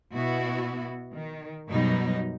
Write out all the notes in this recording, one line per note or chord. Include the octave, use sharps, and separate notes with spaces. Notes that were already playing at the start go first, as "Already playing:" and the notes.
B2 B3 E4 F#4
D#3
F#2 B2 F#3 G3 B3 D#4